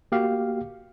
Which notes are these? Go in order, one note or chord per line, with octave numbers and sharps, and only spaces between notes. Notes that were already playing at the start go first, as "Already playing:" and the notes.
A#3 F#4 G4 F5